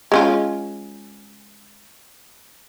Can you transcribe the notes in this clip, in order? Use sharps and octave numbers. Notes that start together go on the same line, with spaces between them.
G#3 C#4 F4